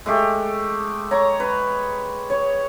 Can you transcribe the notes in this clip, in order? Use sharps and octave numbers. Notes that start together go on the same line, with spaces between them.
G#3 A3 G4
C#5 A#5
B4
C#5